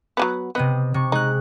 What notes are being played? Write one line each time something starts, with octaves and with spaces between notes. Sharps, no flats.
F#3 G#3 B3
C3 B3 C4 D#5
C3 C#6
G#3 D#4 F#6